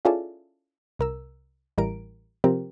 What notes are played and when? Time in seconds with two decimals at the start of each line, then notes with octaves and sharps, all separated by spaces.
0.05 C#4 E4 F4 G#4 A4 D5
0.99 C2 A#4 E6
1.78 A1 E3 G3 A#4 D7
2.44 C3 F3 C4 G4 A#4